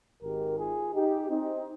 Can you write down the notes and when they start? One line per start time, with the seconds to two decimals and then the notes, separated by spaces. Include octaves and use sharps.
0.22 G#1 G#2 D#3 G4 A#4
0.58 F4 G#4
0.94 D#4 G4
1.29 C4 D#4